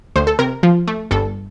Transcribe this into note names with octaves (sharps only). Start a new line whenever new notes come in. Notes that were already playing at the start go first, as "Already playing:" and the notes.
D2 C5
A4
C3 A#4
F3
A3
G1 A4